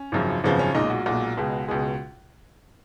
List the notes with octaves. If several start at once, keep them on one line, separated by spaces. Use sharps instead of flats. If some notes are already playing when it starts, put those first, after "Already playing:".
Already playing: C#4
G#1 F#2 C#3 F3
G#1 F#2 C#3 F3 B3
C#4
B1 A#2 G#3 D#4
F#4
B1 A#2 G#3 F#4
C#2 B2 G#3
C#2 B2 G#3 G#4